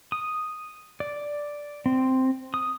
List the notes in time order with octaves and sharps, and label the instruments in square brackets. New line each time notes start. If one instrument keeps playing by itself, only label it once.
[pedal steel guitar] D#6
D5
C4
D#6